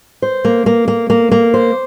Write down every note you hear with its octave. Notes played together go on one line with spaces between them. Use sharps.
C5
A#3
A#3
A#3
A#3
A#3
C5